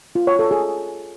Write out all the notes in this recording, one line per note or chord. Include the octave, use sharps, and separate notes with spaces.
F4
C#5
A4
G#4